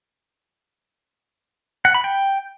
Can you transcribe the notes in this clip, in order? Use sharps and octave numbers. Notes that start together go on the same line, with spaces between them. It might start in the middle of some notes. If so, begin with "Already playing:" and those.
F#5
B5
G5